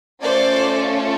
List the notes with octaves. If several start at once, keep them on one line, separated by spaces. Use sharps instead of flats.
A3 C#4 F4 A4 C5 D5